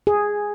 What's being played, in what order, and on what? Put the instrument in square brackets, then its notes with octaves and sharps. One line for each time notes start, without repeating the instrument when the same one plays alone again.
[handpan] G#4